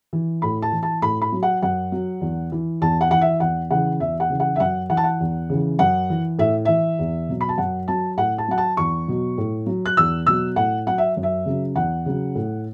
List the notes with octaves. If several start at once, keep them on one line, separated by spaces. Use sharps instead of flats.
E3
A2 B5
A5
E3
A5
A2 B5
B5
F#3
F#5
F#2 F#5
F#3
E2
E3
E2 A5
F#5
E3 F#5
E5
E2 F#5
C#3 E3 F#5
E2 E5
F#5
C#3 E3
F#5
E5
F#2 F#5
E3 F#5
A5
F#5
E2
C#3 E3
F#2 F#5
E3
A2 E5
E3 E5
E2
B2 F#3
B5
A5
F#2 F#5
F#3 A5
A2 F#5
A5
F#3 F#5
A5
E2 C#6
B2 F#3
A2
F#3
F#6
E2 E6
B2 F#3 E6
A2 F#5
F#3 F#5
E5
F#2
E5
C#3 F#3
E2 F#5
C#3 F#3
A2